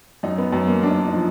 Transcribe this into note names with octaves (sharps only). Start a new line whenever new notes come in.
F#2 D#4
B3
F#2
A#3
F#2 D4
D#4
D4
D#4
F3